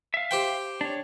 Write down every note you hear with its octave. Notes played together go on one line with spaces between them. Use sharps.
E5 F5
G4 C5 G5
D4 C#5